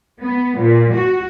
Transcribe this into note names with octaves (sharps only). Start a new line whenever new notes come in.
B3
A#2
F#4